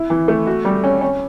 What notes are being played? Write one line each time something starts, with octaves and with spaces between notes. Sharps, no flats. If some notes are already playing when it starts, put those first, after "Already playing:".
Already playing: E4
E3
A3
F#4
G3
C#4
C#4